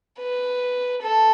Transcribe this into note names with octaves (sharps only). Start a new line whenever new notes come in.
B4
A4